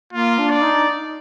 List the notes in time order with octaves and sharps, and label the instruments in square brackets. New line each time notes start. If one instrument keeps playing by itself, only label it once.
[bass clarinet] A#3 [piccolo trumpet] F4
[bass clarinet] D4
[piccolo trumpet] D5
[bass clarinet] D#4